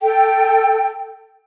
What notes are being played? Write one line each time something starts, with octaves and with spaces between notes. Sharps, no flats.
A4 G5